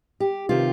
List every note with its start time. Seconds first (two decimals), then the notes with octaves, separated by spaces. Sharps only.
0.20 G4
0.49 C3 D#3 F4